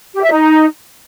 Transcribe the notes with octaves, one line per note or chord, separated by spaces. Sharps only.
G4
E5
D#4